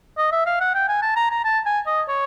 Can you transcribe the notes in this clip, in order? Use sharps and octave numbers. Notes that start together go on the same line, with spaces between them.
D#5
E5
F5
F#5
G5
G#5
A5
A#5
A#5
A5
G#5
D#5
C#5